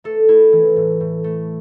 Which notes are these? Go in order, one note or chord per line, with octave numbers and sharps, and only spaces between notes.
A3 A4
A3 E4
E3
A2
A2
A3